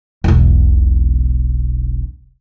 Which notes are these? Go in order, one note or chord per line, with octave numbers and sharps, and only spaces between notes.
E1 B1